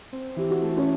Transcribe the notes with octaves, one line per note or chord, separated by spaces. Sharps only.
C4
E3 G4
F#4
A3
C#4